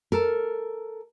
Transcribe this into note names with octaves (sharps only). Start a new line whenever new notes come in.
A4 A#4